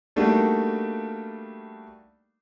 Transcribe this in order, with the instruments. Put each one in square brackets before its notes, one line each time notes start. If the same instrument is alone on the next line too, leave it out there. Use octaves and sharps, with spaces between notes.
[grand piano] G3 A3 A#3 D4 D#4 F#4